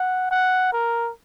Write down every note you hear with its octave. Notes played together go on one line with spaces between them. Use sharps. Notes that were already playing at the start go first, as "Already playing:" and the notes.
Already playing: F#5
F#5
A#4